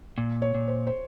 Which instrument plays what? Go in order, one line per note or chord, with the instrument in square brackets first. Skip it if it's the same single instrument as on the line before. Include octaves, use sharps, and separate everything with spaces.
[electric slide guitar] A#2
[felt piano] C#5
[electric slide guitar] A#2
[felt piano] C5
C5